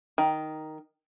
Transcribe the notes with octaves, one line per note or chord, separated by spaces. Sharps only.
D#3